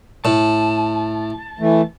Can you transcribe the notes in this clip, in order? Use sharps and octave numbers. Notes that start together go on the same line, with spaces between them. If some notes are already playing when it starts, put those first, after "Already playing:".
A2 A5
E3 A3